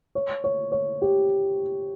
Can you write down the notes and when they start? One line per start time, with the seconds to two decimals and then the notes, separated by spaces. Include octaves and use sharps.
0.15 C#5
0.44 C#5
0.72 C#5
1.02 G4